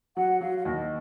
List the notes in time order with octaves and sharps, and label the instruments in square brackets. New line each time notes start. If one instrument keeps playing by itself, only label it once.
[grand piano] F#3 [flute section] F#5
[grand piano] F#3 [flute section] F5
[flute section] F5
[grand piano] D#2 [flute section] D#5